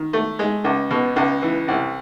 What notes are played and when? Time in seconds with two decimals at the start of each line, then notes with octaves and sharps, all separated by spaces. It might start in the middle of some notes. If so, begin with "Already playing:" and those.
Already playing: D#3
0.13 A3
0.39 G#3
0.64 C#2
0.91 B2
1.16 C#2
1.42 E3
1.68 C2